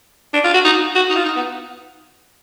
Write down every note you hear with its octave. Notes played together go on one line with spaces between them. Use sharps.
D4
F4
F#4
D#4
F#4
D#4
F4
D#4
B3